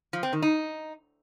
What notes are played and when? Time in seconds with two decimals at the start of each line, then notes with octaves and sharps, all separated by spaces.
0.13 F3
0.23 C4
0.33 D#3
0.42 D#4